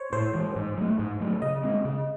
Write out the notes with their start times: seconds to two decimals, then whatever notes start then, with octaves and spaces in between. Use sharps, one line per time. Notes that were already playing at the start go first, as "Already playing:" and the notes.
Already playing: C5 C#5
0.13 A2 C5
0.34 E3 G#3
0.56 G#2
0.78 F#3 A3
0.99 G#2
1.20 F#3 A3
1.42 C#3 D#5
1.64 G#3 C4
1.85 C#3